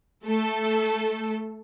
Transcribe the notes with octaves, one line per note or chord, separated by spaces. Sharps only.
A3 A4